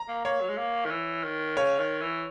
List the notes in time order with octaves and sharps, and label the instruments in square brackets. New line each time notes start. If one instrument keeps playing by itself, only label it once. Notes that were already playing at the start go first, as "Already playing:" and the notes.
Already playing: [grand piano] A#5
[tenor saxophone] A#3
[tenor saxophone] A#3 [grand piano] C#5
[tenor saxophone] F#3
G#3
A#3
D#3
E3
D#3
[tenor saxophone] C#3 [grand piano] C#5
[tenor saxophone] D#3
E3